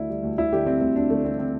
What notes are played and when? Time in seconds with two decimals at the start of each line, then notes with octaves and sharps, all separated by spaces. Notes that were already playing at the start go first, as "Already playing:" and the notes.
Already playing: D2 D3 E4
0.09 G3
0.23 D2
0.37 D2 E4
0.53 D3 G4
0.66 G3 C4
0.81 D2 C4
0.95 D2 D4
1.10 D3 A3
1.24 G3 C4
1.39 C4